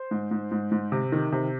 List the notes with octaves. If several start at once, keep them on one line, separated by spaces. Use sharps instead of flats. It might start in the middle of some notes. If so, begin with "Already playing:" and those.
Already playing: C5
G#2
G#2
G#2
G#2
C3
D#3
C3